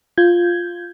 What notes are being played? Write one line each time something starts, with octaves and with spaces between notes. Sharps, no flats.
F4 G6 G#6